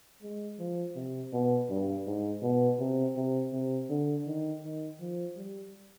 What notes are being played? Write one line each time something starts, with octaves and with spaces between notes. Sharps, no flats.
G#3
F3
C3
B2
G2
G#2
B2
C3
C3
C3
D3
D#3
D#3
F3
G3